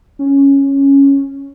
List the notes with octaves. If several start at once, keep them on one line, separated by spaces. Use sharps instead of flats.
C#4